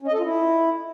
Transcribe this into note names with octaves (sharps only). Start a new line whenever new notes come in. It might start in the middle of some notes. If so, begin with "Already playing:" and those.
C#4
D#5
A4
F4
E4